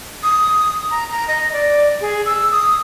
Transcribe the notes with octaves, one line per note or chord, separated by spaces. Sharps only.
D#6
A#5
A#5
D#5
D5
G#4
E6
D#6